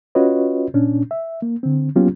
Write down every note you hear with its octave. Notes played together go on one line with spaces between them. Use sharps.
C#4 F4 F#4 B4 C#5 D#5
A#2 C#4 D4
E5
A#3
D3 C4
F#3 A#3 B3 C#4 F4 G4